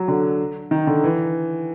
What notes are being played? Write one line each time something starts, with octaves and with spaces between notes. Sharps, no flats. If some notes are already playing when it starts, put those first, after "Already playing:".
Already playing: F#3
D3
D#3
D3
E3